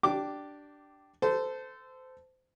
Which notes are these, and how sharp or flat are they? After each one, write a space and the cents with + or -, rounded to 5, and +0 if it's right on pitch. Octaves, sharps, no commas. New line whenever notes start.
D4 +0 G4 -15 D6 +0
A4 +0 C5 -25